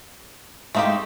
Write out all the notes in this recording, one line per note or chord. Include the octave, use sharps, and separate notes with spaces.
G#3 A3 C4 D#4 G4 F5